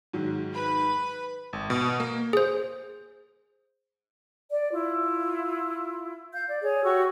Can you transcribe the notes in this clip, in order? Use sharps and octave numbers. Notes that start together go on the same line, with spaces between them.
G#2 D#3 F#3
B4 B5
G#1
B2
A#3
G#4 C5
D5
E4 F4
F5 G6
D5
G#4 C#5
F#4 G4 C#6 E6